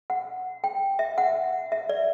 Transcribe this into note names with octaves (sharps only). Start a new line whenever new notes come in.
F#5
G5
E5
F#5
E5
D5